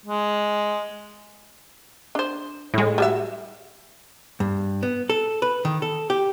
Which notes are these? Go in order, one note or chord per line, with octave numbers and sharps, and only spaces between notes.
G#3
D4 C5
A2 G#3
G3 F#4 E5
G2
B3
A4
B4
D#3
A4
G4